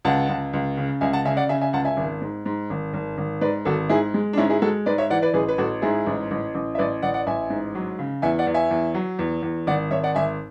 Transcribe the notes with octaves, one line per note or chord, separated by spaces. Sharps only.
C#2 F#5 A5
C#2
C#2
C#3
C#2 E5 G#5
F#5 A5
C#3 E5 G#5
D5 F#5
C#3 E5 G#5
E5 G#5
C#2 F#5 A5
E5 G#5
G#1
G#2
G#2
G#1
G#1
G#1
G#2 B4 D5
G#1 F#4 A4
G#2 E4 G#4
G#3
D4
G#2 C#4 E4
E4 G#4
G#3 F#4 A4
G#2 B4 D5
C#5 E5
E3 D5 F#5
B4 D5
A1 G#4 B4
B4
A1 F#4 A4
G#2 E4 G#4
A1
A1
A1
E5
A1 B4 D5
A1 D5 F#5
D5 F#5
A1 E5 G#5
G#2
F#3
C#3
E2 E5 G#5
D5 F#5
E2
E5 G#5
E2
F#3
E2
E2
G#1 D5 F#5
G#1 C#5 E5
D5 F#5
G#1 E5 G#5